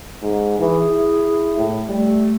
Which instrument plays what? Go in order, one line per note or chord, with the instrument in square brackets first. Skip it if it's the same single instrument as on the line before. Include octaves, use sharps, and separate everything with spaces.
[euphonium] G#2
[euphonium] E3 [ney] G#4
[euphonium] E4
A2
[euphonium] G3 [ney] A3